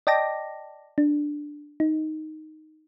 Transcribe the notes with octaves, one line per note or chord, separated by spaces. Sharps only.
D5 D#5 G5 A5 D6 A#6
D4
D#4